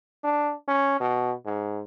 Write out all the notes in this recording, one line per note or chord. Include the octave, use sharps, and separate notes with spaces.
D4
C#4
B2
G#2